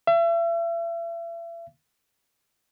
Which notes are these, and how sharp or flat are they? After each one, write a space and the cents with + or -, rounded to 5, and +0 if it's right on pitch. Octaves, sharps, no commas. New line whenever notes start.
E5 +40